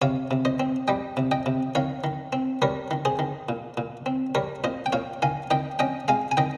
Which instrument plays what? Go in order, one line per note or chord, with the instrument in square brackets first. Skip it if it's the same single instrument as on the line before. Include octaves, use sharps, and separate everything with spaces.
[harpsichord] C3 C#5 F5
C3
C5 D#5
C4
G3 D#5 G5
C3
D#5 G5
C3
D#3 C#5 F5
D#3
C4
G3 A#4 C#5
D#3
G#4 C5
D#3
A#2
A#2
C4
G3 A#4 C#5
A#2 C5 D#5
G5
A#2 C#5 F5
D#3 F5 G#5
D#3 D#5 G5
C#4 D#5 G5
G#3 F5 G#5
G#5
D#3 D#5 G5